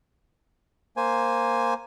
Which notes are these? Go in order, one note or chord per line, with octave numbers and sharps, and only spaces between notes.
A#3 C5 G#5